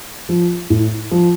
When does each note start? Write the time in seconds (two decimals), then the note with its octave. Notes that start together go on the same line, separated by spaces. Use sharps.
0.29 F3
0.70 A2
1.11 F3